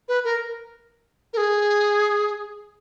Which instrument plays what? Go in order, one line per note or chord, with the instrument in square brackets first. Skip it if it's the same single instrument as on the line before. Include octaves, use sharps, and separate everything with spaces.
[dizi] B4
A#4
A#4
G#4